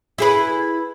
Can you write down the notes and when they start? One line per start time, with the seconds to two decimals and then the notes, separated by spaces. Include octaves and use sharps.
0.18 E4 G#4 B4